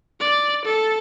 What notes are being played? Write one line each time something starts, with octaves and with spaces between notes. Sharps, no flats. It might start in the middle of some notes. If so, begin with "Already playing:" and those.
D5
A4